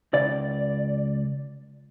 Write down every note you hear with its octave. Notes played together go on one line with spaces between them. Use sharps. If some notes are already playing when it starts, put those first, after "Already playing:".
C#2 D5